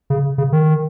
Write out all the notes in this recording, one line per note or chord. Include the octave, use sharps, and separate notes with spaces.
C#3
C#3
D#3